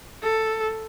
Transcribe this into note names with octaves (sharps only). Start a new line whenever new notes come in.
A4